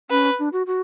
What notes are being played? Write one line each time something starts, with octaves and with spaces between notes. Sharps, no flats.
C#4 B4
D4
F#4
F#4